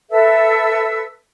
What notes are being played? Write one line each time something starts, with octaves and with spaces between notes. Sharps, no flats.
A4 B4 E5 E6